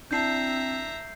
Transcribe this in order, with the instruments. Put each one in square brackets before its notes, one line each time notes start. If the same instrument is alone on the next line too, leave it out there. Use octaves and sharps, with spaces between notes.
[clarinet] C4 [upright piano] D4 E4 A5 [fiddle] E5 A#5 [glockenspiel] G6 C7